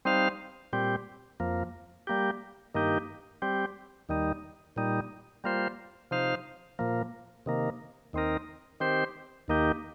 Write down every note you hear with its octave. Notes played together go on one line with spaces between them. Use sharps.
G3 C4 D#4 C5 F5
A#2 G3 C4 G4
F2 F3 A#3
G3 A#3 G4
G2 D#3 A#3 D#4 G4
G3 C4 G4
D#2 D#3 G3 D#4
A#2 G3 D#4
G3 A#3 F4 C5
C3 F3 D#4 C5 F5
A#2 F3 A#3
C3 D#3 A#3
D#2 D#3 C4 D#4 A#4
D#3 C4 G4 C5
D#2 D#3 A#3 D#4 G4